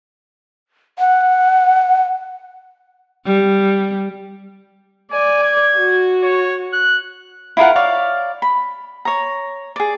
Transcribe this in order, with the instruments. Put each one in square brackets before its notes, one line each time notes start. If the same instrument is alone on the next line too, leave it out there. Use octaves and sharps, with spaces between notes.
[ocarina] F#5
[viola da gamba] G3
[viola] D5 [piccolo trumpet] G#5
[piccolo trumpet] G#6
[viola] F#4
[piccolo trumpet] C#5
F#6
[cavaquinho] E4 F4 A#4 F#5
C#5 D5 F5
B5
C#5 A#5
G#4 D5